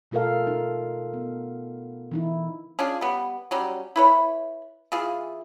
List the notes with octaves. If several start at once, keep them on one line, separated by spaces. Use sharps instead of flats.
B2 A3 F4 A4 A#4 F5
D#4
B3
E3 D#4 E4
C#4 D4 F4 G#4
G3 B3
F#3 G3 C#4
E4 B4 C#5
E3 F4 G#4